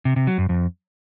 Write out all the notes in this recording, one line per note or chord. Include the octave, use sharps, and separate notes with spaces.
C3
C3
F#3
F#2
F2